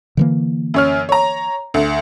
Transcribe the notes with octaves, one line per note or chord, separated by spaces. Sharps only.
D3 E3 A#3
F#2 C#5 F6
C#5 A#5
D2